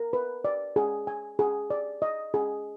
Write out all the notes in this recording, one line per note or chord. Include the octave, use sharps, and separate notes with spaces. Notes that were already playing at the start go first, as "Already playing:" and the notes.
Already playing: A#4
B4
D5
G#4
G#5
G#4
D5
D#5
G#4